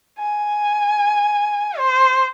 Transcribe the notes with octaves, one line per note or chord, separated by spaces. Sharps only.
G#5
C5